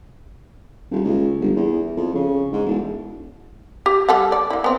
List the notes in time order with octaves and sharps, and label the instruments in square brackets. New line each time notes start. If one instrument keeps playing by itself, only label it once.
[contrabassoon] D#1
C#2
G1
E2
F2
C#3
G#2
E1
[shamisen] G4
G3 A4 F#5
D5
A#3 E4
B3 C4